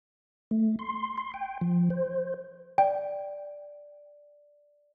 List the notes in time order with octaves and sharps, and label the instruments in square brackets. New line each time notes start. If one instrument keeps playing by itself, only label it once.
[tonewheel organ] A3
C6
C6
G5
F3
C5
[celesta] D5 [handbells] G5